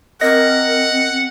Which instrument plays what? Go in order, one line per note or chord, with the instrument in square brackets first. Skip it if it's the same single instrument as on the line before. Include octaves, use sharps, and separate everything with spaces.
[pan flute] C4 [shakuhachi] A#4 [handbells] D#5 A#6 [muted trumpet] F#5